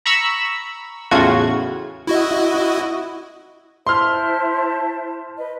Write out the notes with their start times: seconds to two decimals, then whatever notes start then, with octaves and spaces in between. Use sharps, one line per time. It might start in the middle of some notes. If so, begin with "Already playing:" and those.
0.06 A#5 B5 C#6 E6
1.11 E2 A2 C#3 F4 F#4 G#6
2.07 E4 F#4 D#5
3.87 E4 C5 A5 C6 F6
5.37 B4 D#5